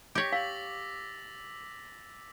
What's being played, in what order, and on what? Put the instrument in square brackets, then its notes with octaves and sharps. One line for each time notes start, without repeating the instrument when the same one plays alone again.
[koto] G4 C#5 [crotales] D6 A#6 B6
[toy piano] F5 [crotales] E6 A6 F#7